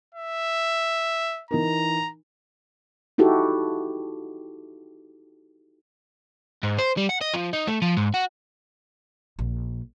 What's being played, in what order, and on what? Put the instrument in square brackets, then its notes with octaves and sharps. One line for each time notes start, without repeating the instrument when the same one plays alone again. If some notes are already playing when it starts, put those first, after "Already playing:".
[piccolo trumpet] E5
[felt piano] E3 D#4 A#4 [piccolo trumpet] A#5
[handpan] D#4 E4 F#4 G4 A4
[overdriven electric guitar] G#2
C5
G3
F#5
D#5
F3
D#4
A3
F3
G#2
F#4
[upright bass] A#1